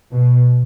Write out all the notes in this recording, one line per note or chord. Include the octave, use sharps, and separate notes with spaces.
B2